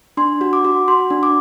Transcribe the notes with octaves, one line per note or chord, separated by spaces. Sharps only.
D4 C6
F#4
D6
F#4
F#4 C6
D4
D6